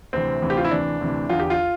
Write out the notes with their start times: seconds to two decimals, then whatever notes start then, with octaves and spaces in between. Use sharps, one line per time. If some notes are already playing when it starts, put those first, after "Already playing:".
0.13 D2 C3 E3 C4
0.42 D2 C3 E3
0.50 G4
0.57 F4
0.64 E4
0.71 D2 C3 E3 D4
1.01 D2 C3 E3
1.29 E2 D3 F4
1.40 G4
1.50 F4